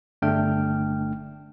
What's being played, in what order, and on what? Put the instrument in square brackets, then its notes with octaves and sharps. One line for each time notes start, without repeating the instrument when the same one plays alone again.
[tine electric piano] G1 A3 D4 G5 F6